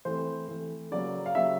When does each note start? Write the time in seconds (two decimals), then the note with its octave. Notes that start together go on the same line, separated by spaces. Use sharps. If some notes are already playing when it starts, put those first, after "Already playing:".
0.05 E3 A3 C4 C5
0.48 E3 A3 C4
0.91 C#3 F#3 A#3 D5
1.26 F5
1.35 C#3 F#3 A#3 E5